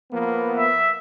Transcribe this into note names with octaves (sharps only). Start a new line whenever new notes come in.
F3 A#3 B3
E5